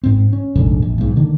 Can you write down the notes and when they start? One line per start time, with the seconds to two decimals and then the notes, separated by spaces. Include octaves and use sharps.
0.04 G#2 C4
0.33 C#4
0.56 F1 A#1 G#2 D3
0.82 A#1
0.98 B1 G#2
1.16 D3 D#3 A#3